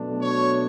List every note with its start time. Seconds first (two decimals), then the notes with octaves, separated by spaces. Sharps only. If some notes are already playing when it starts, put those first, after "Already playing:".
Already playing: B2 F#3 A3 D4
0.19 C#5